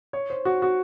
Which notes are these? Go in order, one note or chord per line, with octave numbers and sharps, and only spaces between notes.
C#5
C5
F#4
F#4